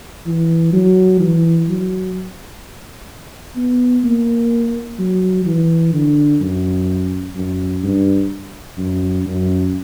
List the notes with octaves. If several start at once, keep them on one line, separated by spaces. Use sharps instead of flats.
E3
F#3
E3
F#3
B3
A#3
F#3
E3
D3
F#2
F#2
G2
F#2
F#2